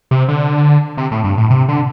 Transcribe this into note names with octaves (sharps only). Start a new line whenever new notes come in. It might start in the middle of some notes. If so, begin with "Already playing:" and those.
C3
D3
C3
A2
G2
A2
C3
D3